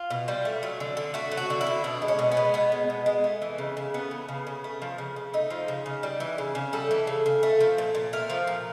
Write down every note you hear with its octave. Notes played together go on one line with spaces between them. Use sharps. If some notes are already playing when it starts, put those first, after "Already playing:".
Already playing: F4
B2
G3
A3
F#3
D3
D3
A3 F#4
F#3
F#4
D3
E4
D3
B2 D4
G#3
C#4
B2
B3
G#3
B2 B3
G#3
B2
G#3
A3
E3
C#3
C#3
A3 B3
E3
C#3
C#3
A3
F3
C#3
C#3
A3 D#4
F3
C#3
C#3
G3
E3
C#3
C#3
G3 A4
E3
C#3
C#3
A3
F3
A#2
A#2
A3 A#4
F3
A#2